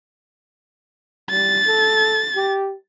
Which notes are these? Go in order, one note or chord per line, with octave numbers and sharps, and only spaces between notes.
G3 A6
A4
G4